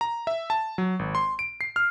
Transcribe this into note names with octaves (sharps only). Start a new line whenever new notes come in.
A#5
E5
A5
F#3
G#1
C6
D7
C7
F6